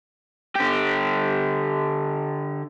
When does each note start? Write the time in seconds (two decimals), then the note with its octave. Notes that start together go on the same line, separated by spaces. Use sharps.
0.56 D3 G4